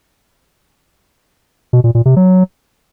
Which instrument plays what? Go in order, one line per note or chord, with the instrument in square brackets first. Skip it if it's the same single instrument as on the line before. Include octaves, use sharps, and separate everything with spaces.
[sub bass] B2
A#2
A#2
C3
F#3